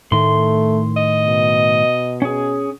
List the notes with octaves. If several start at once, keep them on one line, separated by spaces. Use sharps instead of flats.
A2 D#3 A3 C6
D#5
B2
C#4 G#4